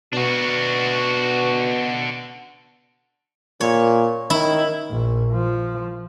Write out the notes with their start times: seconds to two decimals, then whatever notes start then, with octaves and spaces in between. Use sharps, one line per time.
0.13 B2 D4 F#4
3.61 A#2 C#5
4.30 D#3 E4
4.90 A#1
5.33 F3